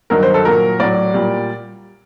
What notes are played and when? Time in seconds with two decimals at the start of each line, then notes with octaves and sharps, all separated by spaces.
0.10 G2 D#3 F#3 A#4
0.23 C5
0.34 A4
0.45 A#2 F#3 A#4
0.80 A2 F#3 D5
1.14 A#2 G3